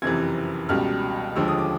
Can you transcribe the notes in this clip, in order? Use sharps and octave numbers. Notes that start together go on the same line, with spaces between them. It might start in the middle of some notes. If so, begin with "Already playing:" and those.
F#1 F2 C3 E3 G#6
C#2 B2 G3 F6
D#2 D3 F3 G#3 E6
D#6
D6